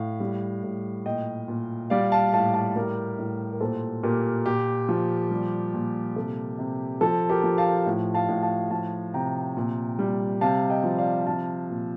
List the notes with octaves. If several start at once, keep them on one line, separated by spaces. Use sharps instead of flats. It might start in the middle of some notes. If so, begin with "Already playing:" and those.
Already playing: A2 F5
G3
A2
A#2 D#5 G5
A#2
G3 D5 F5
F5 A5
A2 F5 A5
F5 A5
G3 G4 A#4
A2
A#4
A#2 A4 C5
A#2 G4 A#4
A#2 G4
F3
G3
A#2
C3 A4
C3
F3 A4
G4 A#4
F3
F5 A5
A2
F5 A5
A2
F5 A5
F3 F5 A5
C3 G5 A#5
A#2
G3
C3 F5 A5
D#5 G5
F3
D5 F5
F3 F5 A5
A#2